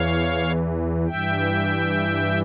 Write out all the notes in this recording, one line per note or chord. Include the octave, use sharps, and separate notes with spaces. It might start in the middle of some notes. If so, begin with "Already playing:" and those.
Already playing: E2 E3 C#5 F5
G2 E3 E5 G5